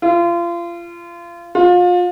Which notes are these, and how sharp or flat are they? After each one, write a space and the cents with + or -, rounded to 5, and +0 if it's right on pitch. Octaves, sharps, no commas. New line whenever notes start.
F4 -30
F4 +30